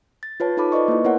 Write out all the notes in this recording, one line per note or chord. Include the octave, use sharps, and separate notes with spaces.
A6
F4 B4 C#5 A5
D#4 F4 A4 A5 B5 D6
B4 C5 D5 D#5 C#6
A#3 E4
B3 E4 A#4 C5 C#5 F#5